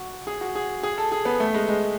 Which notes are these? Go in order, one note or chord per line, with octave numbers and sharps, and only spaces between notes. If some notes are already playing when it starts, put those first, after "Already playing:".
Already playing: F#4
G#4
F#4
G#4
G#4
A4
G#4
B3
A3
G#3
G#3